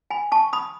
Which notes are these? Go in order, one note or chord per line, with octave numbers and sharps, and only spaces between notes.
G#5 B5
A5 C#6
B5 D#6